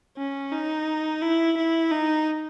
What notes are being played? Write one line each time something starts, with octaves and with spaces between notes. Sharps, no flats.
C#4
D#4
E4
E4
D#4